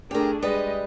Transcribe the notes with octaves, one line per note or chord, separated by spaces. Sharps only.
A3 D4 G4 G#4 A#4
G3 G#3 B4 D#5